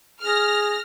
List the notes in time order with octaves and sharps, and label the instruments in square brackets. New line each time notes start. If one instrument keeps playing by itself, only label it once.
[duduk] G#4 [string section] F6 A#6